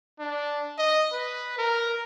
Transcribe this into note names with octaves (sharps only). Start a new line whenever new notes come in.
D4
D#5
B4
A#4